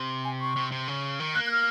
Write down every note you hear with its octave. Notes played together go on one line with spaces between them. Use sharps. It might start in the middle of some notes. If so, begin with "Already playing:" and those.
Already playing: C3
G#5
C#6
C3
C3
C#3
D#3
A#3 F#6
F#6
F6